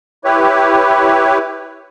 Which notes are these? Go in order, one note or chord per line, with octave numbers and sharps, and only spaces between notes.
E4 G4 B4 C#5